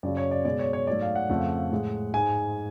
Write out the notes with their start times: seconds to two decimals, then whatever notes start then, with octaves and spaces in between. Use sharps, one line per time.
0.03 F#2 C#3 F#3 D5
0.17 C#5
0.31 D5
0.45 B2 G#3 D5
0.59 C#5
0.73 C#5
0.87 G#2 F#3 A3 D5
1.01 F5
1.15 F#5
1.29 F2 C#3 F3 A3
1.72 A2 G#3
2.14 G#2 G#3 G#5